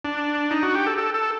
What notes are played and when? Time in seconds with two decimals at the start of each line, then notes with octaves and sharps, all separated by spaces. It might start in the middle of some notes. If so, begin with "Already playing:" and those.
0.05 D4
0.51 D#4
0.63 F#4
0.75 G4
0.86 A4
0.98 A4
1.14 A4